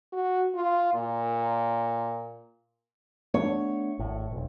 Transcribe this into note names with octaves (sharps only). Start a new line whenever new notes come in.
F#4
F4
A#2
A3 B3 D4 C#5
G#1 A2
E1 B1